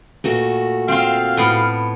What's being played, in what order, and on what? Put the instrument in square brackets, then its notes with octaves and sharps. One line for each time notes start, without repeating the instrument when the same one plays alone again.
[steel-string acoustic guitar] A#2 A3 F#4
[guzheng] C4 F4 [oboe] F5
[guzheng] A2 B3